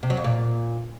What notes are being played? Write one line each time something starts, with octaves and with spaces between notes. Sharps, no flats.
C3
F#3
F2
A#2